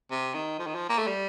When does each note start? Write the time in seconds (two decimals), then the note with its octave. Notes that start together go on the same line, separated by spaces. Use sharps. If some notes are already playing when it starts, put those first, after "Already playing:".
0.11 C3
0.34 D#3
0.59 F3
0.67 D#3
0.75 F3
0.89 A#3
0.98 A3
1.07 G3